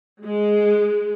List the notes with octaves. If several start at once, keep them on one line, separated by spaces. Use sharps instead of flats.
G#3